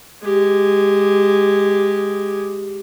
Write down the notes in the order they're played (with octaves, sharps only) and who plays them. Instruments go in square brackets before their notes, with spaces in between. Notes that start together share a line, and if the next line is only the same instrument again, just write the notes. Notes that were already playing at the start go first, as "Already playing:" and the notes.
[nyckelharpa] G#3 G4